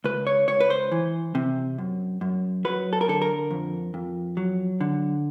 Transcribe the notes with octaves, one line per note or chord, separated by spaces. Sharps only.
C#2 B4
C#5
C#2 C#5
B4
C5
E3
C3
F#2
F#2
F#3 B4
A4
A#4
D3 A4
A#4
F2
F2
F#3
D3